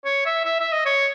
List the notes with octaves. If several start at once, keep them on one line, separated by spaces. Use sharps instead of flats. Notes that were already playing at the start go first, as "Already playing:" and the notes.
C#5
E5
E5
E5
D#5
C#5